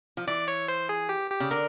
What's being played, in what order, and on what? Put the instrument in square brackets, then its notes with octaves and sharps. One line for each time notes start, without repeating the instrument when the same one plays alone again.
[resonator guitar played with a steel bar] F3
[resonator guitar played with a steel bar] E3 [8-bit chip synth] D5
[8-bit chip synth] C#5
C5
G#4
G4
G4
[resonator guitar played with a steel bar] C#3
[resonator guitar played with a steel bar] D3 [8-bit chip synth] A#4